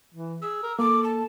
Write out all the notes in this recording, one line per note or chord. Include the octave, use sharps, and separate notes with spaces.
E3
G#4 E6
A#4
A#3 A4 D6
A5